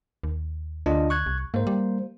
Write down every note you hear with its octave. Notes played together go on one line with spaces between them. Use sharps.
D#2
D2 D4 F4 D#5
C#6 F#6 G#6
C2
G#2 A#3 C5
G3